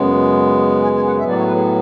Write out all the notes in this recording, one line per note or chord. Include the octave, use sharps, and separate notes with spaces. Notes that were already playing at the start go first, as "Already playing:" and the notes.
Already playing: F#2 C#3 G#3 B3
G#5
G#5
F#5
A2 F#3 B3 E5
D5
C#5
B4
G#4